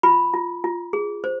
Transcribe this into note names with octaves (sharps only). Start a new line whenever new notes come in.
F4 B5
F4
F4
G#4
C5